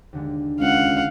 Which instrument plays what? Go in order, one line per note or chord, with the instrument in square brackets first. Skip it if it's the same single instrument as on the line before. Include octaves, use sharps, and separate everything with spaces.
[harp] D#2 D3 G#3
[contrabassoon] C#2 [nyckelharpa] F5 F#5